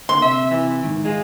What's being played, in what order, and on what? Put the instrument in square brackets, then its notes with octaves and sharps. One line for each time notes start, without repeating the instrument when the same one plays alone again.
[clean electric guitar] D3 A#3 [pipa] C6
[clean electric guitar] C3 [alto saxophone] E5
[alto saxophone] E3
[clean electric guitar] G#2 D#3
[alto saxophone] G#3 [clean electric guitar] F4